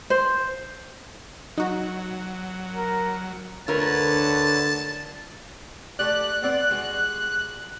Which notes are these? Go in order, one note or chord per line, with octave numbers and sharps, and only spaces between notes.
C5
F#3 D#4 F#4
A#4
D2 D3 F4 A#4 B4 C#5 A5
A3 G4 D5 F#6
B3 C4 D5
G3 G#3 F#4